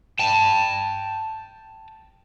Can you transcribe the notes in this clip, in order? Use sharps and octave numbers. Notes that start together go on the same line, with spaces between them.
G5 A5